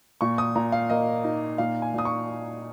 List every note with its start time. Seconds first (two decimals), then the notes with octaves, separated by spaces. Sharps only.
0.21 A#2 C#6
0.38 D#6
0.55 A#2 A#5
0.72 F5
0.90 A#3 D#5
1.24 D#4
1.58 A#2 F5
1.82 G#5
1.94 A#2 D#6
2.05 C#6